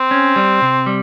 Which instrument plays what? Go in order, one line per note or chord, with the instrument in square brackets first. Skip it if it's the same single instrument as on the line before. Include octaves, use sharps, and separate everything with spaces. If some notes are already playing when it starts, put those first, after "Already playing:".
Already playing: [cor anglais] C4
[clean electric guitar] C#4
G3
C3
G3